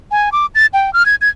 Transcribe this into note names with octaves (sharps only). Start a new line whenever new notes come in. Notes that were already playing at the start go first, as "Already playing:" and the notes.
G#5
D6
A6
G5
F6
G#6
G#6